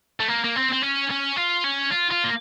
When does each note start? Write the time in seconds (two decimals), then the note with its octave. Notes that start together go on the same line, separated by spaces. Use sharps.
0.20 A3
0.28 A#3
0.44 A#3
0.56 C4
0.73 C4
0.83 C#4
1.10 C#4
1.36 F4
1.64 C#4
1.91 F4
2.11 F4
2.24 A#3